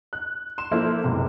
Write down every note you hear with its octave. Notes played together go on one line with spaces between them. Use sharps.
F#6
C6 E7
F3 A#3 E4 A4 C5
F#1 C#2 C3